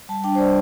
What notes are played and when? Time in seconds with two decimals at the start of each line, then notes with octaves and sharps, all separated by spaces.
0.09 G3 A5
0.24 D4 G5
0.35 C5
0.39 G3 D5